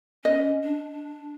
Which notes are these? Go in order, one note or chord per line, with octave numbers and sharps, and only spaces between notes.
C#4 D#5
D4